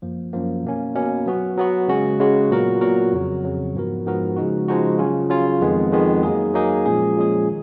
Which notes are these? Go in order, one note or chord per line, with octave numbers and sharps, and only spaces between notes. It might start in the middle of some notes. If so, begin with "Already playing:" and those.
F#2 F3 A#3
F#2 F3 A#3
B2 A#3 C#4
B2 A#3 C#4
F#3 B3 F#4
F#3 B3 F#4
C#3 G#3 C#4 F#4
C#3 G#3 C#4 F#4
A#2 F#3 B3 F#4 A#4
A#2 F#3 B3 F#4 A#4
F2 C#3 F#3
F2 C#3 F#3
G#2 F3 B3 F#4 A#4
G#2 F3 B3 F#4 A#4
C#3 F3 G#3 D#4 F#4
C#3 F3 G#3 D#4 F#4
C#3 F#3 C#4 F4
C#3 F#3 C#4 F4
F2 D#3 G#3 B3
F2 D#3 G#3 B3
F#3 A#3 D#4 G#4
F#3 A#3 D#4 G#4
A#2 F3 G#3 C#4 G#4
A#2 F3 G#3 C#4 G#4
D#3